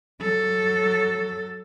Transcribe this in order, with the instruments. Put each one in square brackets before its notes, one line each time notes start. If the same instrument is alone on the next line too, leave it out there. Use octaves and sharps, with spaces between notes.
[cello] F#3 A4